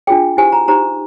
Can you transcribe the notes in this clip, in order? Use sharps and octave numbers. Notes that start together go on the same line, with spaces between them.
D4 F4 G#4 G5
E4 G4 C5 G#5
A#5
D#4 G4 C5 A#5